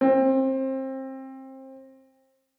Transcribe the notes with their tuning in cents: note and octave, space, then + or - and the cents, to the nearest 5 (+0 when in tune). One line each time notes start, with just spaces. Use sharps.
C4 +25